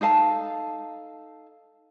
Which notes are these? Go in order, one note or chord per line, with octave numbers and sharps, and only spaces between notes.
D#4 A4 F5 A5